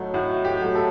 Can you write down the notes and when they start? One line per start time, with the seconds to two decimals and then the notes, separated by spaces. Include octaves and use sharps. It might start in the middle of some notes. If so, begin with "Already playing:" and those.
Already playing: A2 F#3 A3 D#4
0.14 A2 F#4
0.45 G4
0.61 F#3 A3
0.75 A4